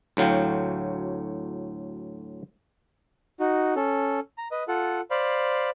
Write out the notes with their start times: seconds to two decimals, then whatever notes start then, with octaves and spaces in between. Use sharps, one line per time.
0.17 D2 A2 F#3 F5 G5
3.40 D#4 F#4
3.76 C#4 A4
4.38 A#5
4.51 B4 D#5
4.68 F4 A4 F#5
5.11 C5 D5 F5 B5